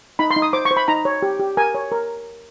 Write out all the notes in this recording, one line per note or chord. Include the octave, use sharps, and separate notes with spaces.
D#4 B5
C6
D#4
D#6
C5 D6
C#6
C5
B5
D#4 A#5
C#5
G4
G4
A#4 G#5
C#5
A#4